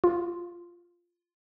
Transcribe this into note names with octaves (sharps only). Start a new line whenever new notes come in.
F4